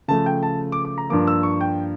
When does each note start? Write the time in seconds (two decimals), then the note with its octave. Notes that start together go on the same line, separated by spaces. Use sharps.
0.08 C#3 F3 A3 A5
0.26 G5
0.43 A5
0.72 D6
0.85 D6
0.98 A#5
1.10 G2 F3 A#3 D6
1.27 E6
1.43 C#6
1.61 G5